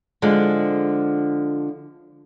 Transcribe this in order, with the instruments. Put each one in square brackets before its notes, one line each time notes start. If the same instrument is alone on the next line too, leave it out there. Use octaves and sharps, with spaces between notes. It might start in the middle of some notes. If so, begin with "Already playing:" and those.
[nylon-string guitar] D3 F3 G#3